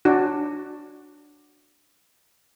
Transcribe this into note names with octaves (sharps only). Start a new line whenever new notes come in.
D4 F#4